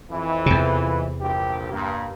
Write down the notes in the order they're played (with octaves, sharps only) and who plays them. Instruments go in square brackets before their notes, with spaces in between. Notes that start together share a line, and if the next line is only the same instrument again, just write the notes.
[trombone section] F2 E3
[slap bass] E2 C3
[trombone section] A#1 G2 G4
G2 A#3